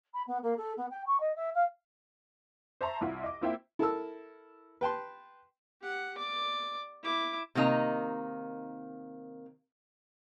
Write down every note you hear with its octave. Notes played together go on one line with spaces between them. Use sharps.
B5
B3
A#3
A4
B3
G5
C#6
D#5
E5
F5
C5 E5 A5 A#5 C6 C#6
C2 E4 F4 F#5
D#5 D6
A#3 C4 E4 F4 E5 G5
E4 A4 A#4 A5 E6
B4 G5 A5 C6
G4 F#5
D5 D6
E4 D6
C3 D#3 A#3 D#4 A#5